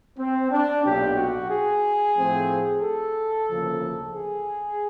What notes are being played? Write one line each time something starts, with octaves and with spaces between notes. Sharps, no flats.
C4
D4
B1 A#2 F#3 G4
F#4
G#4
A2 F3 A3 C4
A4
D2 C#3 F3 A#3
G#4